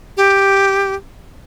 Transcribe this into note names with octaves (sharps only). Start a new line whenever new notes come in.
G4